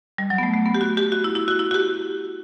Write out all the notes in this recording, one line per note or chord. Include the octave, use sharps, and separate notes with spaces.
G3
F#3
B3
A3
A3
B3
G4
F#4
G4
F#4
E4
E4
F#4
E4
F#4
G4